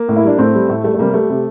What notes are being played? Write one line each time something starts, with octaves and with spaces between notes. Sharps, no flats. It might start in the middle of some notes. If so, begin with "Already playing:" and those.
Already playing: A#3
A2
E4
G3 D4
A2 A3 C4
G3
A2 A3
G3 A3
A3
C3 G3 A#3
G3 A3
C3